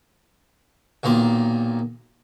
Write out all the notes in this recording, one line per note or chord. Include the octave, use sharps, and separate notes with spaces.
B1 A#2 D#3 C6